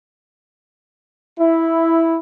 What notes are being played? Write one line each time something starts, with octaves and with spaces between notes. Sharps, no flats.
E4